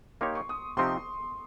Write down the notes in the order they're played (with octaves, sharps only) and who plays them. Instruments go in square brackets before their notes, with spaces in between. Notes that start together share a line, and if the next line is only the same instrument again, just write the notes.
[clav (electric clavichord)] A#3 D#4 G4 C#5 [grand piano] C6
[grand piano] C#6
D#6
[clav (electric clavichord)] C3 F3 C4 D#4 G4 [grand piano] C6